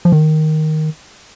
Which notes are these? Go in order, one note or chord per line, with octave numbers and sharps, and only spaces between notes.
F3
D#3